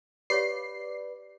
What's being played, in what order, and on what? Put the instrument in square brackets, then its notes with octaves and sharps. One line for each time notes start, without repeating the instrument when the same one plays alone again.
[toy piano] G4 C#5 F5 [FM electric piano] B4 D5 [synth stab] C7